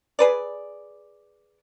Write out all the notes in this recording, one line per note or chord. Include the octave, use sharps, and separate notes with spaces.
G#4 B4 D5